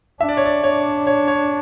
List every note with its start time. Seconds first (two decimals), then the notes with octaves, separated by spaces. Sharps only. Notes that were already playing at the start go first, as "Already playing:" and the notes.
0.20 D4 E5
0.29 D5
0.37 C#5
0.45 D5
0.64 D4 C#5
1.07 C#5
1.28 C#5